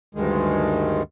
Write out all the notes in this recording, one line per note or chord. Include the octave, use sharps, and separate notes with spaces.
D2 G2 D#3 G#3